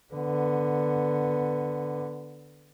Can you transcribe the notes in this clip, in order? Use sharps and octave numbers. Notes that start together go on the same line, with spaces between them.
D3 B3